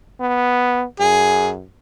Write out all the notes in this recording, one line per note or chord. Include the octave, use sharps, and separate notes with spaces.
B3
F#2 G#4